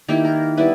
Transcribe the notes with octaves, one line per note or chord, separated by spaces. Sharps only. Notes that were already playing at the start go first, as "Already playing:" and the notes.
D#3 A#3 E4 G4
A#4
G3 B3 E4 B4